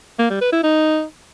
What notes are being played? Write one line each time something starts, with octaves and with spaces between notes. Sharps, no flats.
A#3
G3
B4
E4
D#4